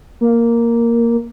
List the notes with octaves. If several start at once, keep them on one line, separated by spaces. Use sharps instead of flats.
A#3